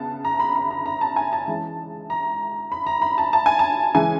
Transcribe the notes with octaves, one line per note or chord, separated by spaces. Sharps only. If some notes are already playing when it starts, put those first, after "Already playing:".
Already playing: C#3 B3 A5
A#5
B5
B5
A#5
A#5
A5
G#5
A5
E3 G#3 C#4
A#5
B5
A#5
B5
A5
A5
G#5
A5
C#3 E3 G#3 G#5